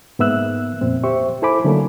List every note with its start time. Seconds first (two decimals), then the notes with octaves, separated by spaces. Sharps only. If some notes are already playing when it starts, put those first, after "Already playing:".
0.19 G#2 A#3 B3 E5 E6 F#6
0.81 F2 A#2 C4
1.04 G4 C5 E5 C#6
1.42 E4 A4 C5 G#5 B5 D6
1.64 D3 F#3 A3 A#3 D4 A4